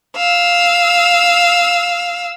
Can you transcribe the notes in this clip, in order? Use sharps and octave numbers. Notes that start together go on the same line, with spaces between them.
F5 E6